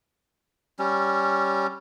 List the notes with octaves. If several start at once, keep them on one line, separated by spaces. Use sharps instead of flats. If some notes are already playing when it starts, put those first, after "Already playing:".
G3 C#4